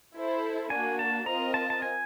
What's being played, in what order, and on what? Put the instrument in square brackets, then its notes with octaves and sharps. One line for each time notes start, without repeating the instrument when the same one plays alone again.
[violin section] E4 A4 C5
[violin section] A#3 D4 F#4 [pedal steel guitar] G#5
[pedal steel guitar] A5
[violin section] C4 F4 A#4 D#5 [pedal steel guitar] A#5
[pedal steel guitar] A5
A5
G#5